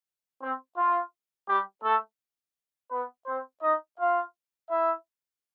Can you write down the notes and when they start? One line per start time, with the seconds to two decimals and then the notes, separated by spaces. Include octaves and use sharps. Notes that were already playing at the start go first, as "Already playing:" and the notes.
0.41 C4
0.77 F4
1.48 G3 G4
1.83 A3 A4
2.90 B3 B4
3.26 C4 C5
3.62 D#4 D#5
3.98 F4 F5
4.69 E4 E5